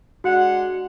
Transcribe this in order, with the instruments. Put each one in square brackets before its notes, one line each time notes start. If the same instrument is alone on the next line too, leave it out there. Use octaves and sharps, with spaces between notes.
[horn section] G#3 D4 F#5 [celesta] F#4